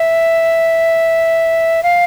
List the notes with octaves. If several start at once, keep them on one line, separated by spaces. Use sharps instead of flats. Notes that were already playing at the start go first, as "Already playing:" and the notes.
Already playing: E5
F5